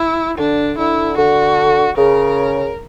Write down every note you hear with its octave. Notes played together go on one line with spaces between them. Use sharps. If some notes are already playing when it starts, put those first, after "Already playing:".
Already playing: E4
D3 D4
D3 E4
D3 F#4
C#3 A#4